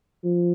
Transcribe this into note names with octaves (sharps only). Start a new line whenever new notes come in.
F3